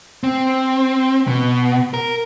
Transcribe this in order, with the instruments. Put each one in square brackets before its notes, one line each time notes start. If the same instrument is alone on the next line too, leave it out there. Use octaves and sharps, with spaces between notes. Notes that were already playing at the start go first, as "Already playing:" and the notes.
[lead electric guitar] C4
B2
A#4